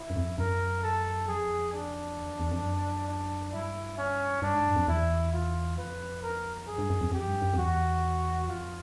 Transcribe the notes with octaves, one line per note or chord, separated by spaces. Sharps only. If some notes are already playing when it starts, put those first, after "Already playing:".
Already playing: E4
F#2
F2
F#2 A#4
A4
F2 G#4
D4
E2
F2
E2
F2
F#2
D4
G2 E4
C#4
G2 D4
G#2
F#2
F2
E2 E4
F4
F2 B4
A#4
F#2 G#4
G2
F#2
F2
F2 G4
G2
F#2
F2
E2 F#4
F2 F4